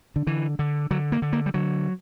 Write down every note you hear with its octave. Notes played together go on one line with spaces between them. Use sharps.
D3
D3 E3
D3
D3 F#3
A#3
D3
A#3
G3
D3 F#3